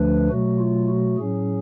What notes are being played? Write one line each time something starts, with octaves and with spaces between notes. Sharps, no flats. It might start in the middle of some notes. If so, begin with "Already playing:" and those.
Already playing: D2 D3 F3 A3 D4 B4
B2 F#3 A3 F#4
F4
F#4
A2 F#3 C#4 G#4